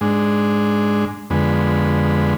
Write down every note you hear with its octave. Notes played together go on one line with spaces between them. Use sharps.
G#2 G#3 D4
F2 D3 G#3 B3